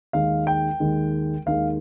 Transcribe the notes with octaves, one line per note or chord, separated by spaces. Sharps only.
D#2 D#3 G#3 F5
G5
D#2 D#3 G#3
D#2 D#3 G#3 F5